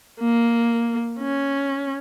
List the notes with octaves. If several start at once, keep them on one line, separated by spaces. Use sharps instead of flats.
A#3
C#4